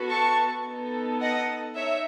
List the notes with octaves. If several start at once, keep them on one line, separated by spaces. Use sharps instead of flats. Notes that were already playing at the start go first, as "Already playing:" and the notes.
Already playing: B3 F#4 A4
A5 C#6
B3 D#4 A4
D#5 F#5
D#4 C#5 E5